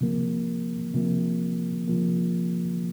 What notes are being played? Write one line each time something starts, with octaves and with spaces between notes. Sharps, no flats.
C3 F3 A#3
C3 F3 A#3
C3 F3 A#3